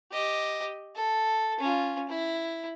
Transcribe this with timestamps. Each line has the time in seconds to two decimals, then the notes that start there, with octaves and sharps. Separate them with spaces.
0.11 G4 D#5
0.95 A4
1.60 C#4 F4
2.09 E4